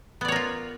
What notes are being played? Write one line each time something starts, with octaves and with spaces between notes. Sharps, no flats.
B3 F4 A#4 C#5 D5